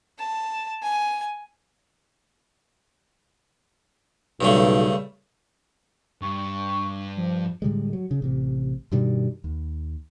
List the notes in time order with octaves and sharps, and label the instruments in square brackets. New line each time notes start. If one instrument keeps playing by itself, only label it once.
[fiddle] A5
G#5
[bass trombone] B1 [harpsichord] G2 C#3 A3
[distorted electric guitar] G2 [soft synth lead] C#6
[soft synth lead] F3
[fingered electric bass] A2 D3 G3 G#3
F#3
C#3
A1 C3
G2 B2 D#3 G3
D#2